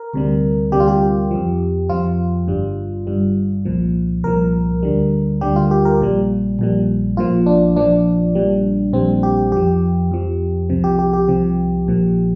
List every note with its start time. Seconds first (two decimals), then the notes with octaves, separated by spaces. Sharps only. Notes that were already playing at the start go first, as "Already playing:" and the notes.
Already playing: A#4
0.14 D2 C3 G3
0.72 D2 C3 G3 G4
0.80 F4
0.88 G4
1.31 F2 F3
1.89 F2 F3 F4
2.48 G1 G2 G3
3.07 G1 G2 G3
3.65 C2 A#2 F3
4.24 C2 A#2 F3 A#4
4.83 D2 D3 G3
5.41 D2 D3 G3 G4
5.56 F4
5.71 G4
5.85 A#4
6.01 A#1 A#2 G3
6.59 A#1 A#2 G3
7.17 A#1 A#2 F3 F4
7.46 D4
7.76 A#1 A#2 F3 D4
8.35 A#1 A#2 G3
8.93 A#1 A#2 G3 C4
9.23 G4
9.52 F2 F3 G4
10.11 F2 F3
10.69 C2 C3 F3
10.84 G4
10.99 G4
11.13 G4
11.28 C2 C3 F3
11.87 A#1 A#2 F3